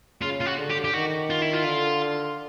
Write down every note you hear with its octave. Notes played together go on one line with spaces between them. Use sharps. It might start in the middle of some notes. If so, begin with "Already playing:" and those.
C#3 F4
F4
F#4
D3
G4
G4
D#3 F#4
F4
E4
F4
D3